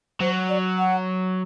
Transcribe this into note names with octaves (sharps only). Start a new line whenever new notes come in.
F#3 C5
D5
F#5